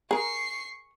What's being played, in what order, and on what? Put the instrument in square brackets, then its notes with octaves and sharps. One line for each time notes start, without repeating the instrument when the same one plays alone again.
[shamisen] G#4 A#4 [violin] C#6 C7